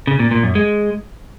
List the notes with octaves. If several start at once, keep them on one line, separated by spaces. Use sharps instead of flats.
C#3
A#2
A#2
F#2
G#3